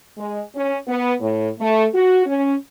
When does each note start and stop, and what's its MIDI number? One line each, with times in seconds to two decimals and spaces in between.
0.18 0.42 56
0.55 0.76 61
0.87 1.14 59
1.21 1.48 45
1.60 1.86 57
1.94 2.23 66
2.26 2.54 61